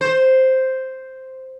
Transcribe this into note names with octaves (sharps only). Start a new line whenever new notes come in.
C5